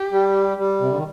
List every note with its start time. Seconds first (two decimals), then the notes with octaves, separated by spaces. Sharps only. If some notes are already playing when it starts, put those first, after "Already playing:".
Already playing: G4
0.12 G3
0.57 G3
0.81 C3
0.89 D3
0.96 D#3